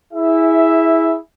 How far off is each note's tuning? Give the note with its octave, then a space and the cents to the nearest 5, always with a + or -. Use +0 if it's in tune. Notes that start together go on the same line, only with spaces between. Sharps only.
E4 -15 G#4 +0 E5 +0